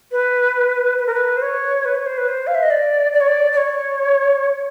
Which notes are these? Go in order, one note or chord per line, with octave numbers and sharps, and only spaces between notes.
B4
B4
A#4
B4
C5
C#5
B4
C#5
C5
B4
C5
F5
E5
D#5
D5
D5
C#5
D5
D5
C#5